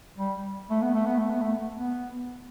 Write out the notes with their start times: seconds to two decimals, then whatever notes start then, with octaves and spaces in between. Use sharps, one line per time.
0.17 G3
0.70 A3
0.82 B3
0.95 A3
1.06 B3
1.18 A3
1.30 B3
1.41 A3
1.77 B3